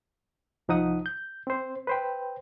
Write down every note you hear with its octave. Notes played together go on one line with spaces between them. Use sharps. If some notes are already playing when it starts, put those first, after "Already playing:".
C2 F3 D#4 F#5 D#6
G6
C4 C5
B4 C5 G5